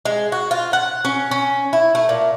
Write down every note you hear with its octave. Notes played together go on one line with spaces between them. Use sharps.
G#3
F#4
F4
F#5
C#4
C#4
E4
A3
A#2